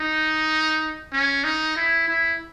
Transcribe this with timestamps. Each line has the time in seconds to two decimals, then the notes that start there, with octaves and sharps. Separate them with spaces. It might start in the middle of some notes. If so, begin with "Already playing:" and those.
Already playing: D#4
1.12 C#4
1.44 D#4
1.76 E4
2.08 E4